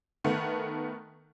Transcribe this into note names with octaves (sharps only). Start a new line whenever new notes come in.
D#3 A3 B3